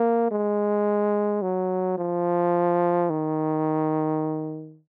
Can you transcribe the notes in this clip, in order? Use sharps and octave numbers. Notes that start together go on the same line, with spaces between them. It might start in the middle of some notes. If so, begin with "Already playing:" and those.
Already playing: A#3
G#3
F#3
F3
D#3